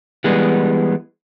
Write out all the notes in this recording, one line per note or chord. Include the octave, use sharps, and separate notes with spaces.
E3 G3 G#3 B3